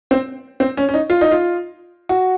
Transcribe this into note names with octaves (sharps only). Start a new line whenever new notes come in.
C4
C4
C#4
C#4
D#4
F4
D#4
F4
F#4